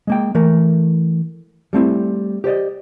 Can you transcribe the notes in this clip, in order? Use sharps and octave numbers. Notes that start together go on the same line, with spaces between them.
G#3 A#3 G5
E3 A3 A#4
G3 A3 C4 E4
G4 C5 D5 D#5